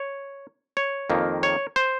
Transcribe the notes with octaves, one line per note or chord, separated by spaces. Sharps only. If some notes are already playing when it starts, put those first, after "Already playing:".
Already playing: C#5
C#5
F2 D#3 A#3
C#5
C5